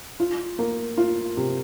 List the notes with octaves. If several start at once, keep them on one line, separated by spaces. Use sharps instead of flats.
F4
A#3
F4
C3